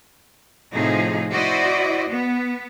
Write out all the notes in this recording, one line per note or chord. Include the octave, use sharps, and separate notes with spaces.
A2 C3 F3 D#4 G#4
E4 F#4 C5 D5 D#5
B3